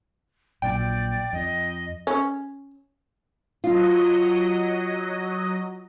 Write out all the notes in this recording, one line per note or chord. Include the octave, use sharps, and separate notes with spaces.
A#1 A#2 F#3 D5 G5
F2 D#5
C#4
F#3 F4 D#5